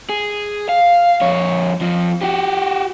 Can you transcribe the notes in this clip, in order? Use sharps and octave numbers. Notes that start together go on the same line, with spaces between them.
G#4
F5
F2 C#5
F2 F3
F#4 G4